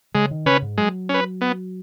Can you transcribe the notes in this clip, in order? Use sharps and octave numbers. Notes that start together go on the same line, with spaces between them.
C#3 G#3
D#3
C#3 C#4 B4
G#2
F#3 G#3
C#4 B4
B3